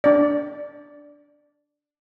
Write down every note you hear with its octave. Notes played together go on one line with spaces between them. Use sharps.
D4 D5